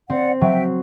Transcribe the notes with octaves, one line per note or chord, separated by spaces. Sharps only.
C4 D5 F#5
F#3 E5 G5